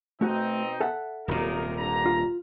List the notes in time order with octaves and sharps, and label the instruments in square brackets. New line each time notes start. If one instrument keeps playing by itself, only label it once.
[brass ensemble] B2 C4 D#4 [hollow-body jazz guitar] A3 F#4
[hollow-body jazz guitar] A4 E5 F#5
[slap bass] D#1 C3 [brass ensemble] F#3 D#4 A#4
[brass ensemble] G2 D3 A#5
[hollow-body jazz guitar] F4